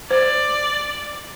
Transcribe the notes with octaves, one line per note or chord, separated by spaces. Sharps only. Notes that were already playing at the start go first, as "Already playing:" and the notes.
C5 D5